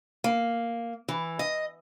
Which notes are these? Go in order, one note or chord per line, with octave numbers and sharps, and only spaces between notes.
A#3
E3
D#5